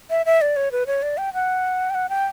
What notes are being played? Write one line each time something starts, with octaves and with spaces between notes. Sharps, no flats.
E5
E5
D5
C#5
B4
C#5
D5
G5
F#5
G5
F#5
G5